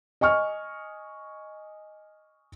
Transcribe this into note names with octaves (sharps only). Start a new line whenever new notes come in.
D#5 G#5 C#6 F6